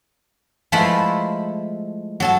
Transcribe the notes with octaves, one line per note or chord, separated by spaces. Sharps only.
F3 G#3 A3 E4 A4 B4
F#3 A4 A5